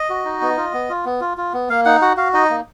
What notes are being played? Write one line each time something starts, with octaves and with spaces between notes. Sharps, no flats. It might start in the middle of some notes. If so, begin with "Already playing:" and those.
Already playing: D#5
F#4
D#4
B3
F4
B3
F4
B3
F4
F4
B3
A#3 F5
D#4 F#5
F#4 F#5
F#4 F5
D#4 D#5
A#3